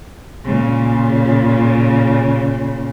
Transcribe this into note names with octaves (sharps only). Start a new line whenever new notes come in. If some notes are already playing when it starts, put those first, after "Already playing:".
A#2 C#3